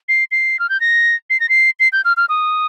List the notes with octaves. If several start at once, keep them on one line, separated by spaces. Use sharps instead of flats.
C7
C7
F6
G6
A#6
C7
A#6
C7
C7
G6
F6
F6
D#6